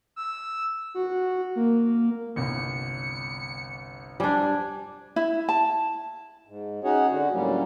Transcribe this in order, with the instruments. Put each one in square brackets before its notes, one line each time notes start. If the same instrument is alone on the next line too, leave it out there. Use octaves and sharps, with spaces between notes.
[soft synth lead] E6
F#4
A#3
[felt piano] G1 C2 [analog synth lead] C#7
[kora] G3 D4 [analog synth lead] G#5
[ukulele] E4
A5
[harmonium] G#2
C#4 D#4 F#4 G#4 C#5 F#5
D3 F#4
D2 A2 F#3 G3 A#3 C#4